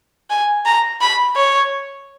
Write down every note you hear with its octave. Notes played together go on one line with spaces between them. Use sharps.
G#5
A#5
B5
C#5